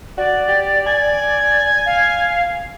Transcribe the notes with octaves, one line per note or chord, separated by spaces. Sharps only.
F#4 D5
G4
G#5
F5